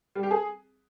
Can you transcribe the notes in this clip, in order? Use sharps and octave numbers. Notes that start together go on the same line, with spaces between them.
G3
G4
G#4